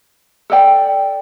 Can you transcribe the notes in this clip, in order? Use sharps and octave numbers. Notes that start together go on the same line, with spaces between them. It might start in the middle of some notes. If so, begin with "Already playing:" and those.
A4 D5 G5